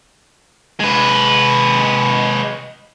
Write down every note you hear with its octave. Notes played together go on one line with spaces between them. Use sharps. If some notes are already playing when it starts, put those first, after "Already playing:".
G#3 B4